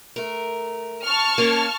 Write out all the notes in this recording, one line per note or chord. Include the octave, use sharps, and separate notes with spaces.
A3 A#4
A5 C#6 F6
A#3 C#4